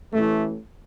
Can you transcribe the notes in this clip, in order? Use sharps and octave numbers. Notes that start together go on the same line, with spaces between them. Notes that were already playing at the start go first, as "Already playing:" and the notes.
A1 A2 E3 A3